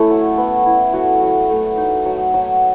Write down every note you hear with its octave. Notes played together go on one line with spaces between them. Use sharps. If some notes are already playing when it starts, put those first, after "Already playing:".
Already playing: A3 C#4 E4 A4
F#3
B3
E4
F#3 F#4
F#3
A3
D#4
F#3
F#3